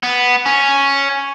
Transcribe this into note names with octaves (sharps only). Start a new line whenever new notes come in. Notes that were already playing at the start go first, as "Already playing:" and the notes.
B3
C#4